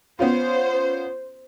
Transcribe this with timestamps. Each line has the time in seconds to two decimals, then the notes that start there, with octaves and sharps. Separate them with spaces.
0.19 B3 C#4 F4 C5